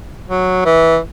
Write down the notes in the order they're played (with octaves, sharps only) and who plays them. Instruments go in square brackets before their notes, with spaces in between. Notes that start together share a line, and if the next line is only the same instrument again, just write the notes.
[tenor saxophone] F#3
E3